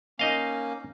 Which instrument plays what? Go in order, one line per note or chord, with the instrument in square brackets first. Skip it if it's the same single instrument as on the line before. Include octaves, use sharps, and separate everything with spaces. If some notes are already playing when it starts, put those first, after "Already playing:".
[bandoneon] A#3 C#4 [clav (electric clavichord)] D#4 D#5 F5